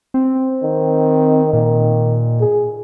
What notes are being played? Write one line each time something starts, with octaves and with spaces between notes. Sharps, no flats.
C4
D#3
A#2 D#3
G#4